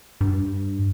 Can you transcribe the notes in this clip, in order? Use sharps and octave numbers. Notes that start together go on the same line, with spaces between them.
G2